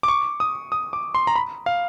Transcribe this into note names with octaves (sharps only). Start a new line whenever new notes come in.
D6
C#6
D#6
D#6
D6
C6
A#5
B5
F5